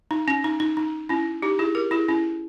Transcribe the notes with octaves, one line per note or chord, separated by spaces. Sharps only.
D#4
C#4
D#4
D#4
D#4
C#4 E4
D#4 G4
E4 G#4
G4 A#4
E4 G#4
C#4 E4